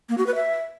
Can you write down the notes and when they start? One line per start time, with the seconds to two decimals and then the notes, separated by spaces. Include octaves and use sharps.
0.09 A#3
0.18 F#4
0.26 B4
0.35 E5